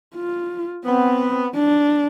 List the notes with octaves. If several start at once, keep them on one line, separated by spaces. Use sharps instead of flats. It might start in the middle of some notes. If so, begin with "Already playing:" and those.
F4
B3 C4
D4